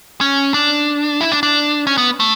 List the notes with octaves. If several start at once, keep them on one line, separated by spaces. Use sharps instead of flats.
C#4
D4
E4
D4
D4
C#4
B3
A3